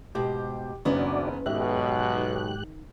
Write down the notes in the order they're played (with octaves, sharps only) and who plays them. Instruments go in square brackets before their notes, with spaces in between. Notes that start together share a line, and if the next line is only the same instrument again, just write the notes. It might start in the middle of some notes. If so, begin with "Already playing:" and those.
[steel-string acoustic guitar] G#2 B2 C5 [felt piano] G4
[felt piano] F#1 [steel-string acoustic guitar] D#3 B3 C#4 [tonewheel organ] D4 F#4 D5
[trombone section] B1 B2 [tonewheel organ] G#2 G4 F#6 [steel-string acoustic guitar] D#3 [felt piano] E5